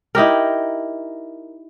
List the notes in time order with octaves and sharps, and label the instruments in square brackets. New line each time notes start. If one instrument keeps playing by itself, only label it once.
[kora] D#4 E4 G4 A#4